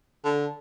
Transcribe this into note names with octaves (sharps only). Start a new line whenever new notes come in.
D3